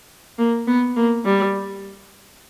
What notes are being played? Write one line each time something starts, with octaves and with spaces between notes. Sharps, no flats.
A#3
B3
A#3
G3